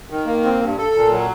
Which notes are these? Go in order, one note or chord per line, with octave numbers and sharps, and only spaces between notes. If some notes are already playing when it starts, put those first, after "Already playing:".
D#3
A#3
C4
G2
A4
A#2
F#3